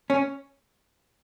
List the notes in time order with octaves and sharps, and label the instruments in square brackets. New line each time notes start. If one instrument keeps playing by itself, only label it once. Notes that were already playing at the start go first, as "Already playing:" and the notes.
[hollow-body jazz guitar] C#4